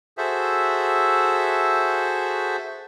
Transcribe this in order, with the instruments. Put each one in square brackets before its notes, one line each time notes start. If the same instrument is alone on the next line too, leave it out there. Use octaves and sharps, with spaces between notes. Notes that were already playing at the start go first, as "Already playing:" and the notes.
[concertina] F#4 G#4 A4 C5 E5